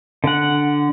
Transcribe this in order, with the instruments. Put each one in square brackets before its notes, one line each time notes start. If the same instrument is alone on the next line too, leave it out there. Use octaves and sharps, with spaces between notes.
[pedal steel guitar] D3 F#5